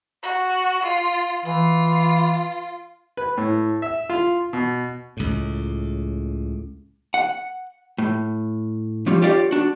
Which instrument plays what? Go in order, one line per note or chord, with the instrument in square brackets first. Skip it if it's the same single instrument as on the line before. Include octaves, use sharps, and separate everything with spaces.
[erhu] F#4
F4
[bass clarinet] E3 [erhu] F4
[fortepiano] B4
A2
E5
F4
B2
[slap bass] C#2 A2
[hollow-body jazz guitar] F#5
A2
F3 G3 C4 C#4 F4
F4 G4 C#5 D5 E5 F5
D4 F#4